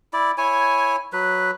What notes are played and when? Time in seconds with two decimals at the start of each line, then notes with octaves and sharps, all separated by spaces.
0.13 E4 D5
0.38 E4 C#5 G#5
1.13 F#3 B4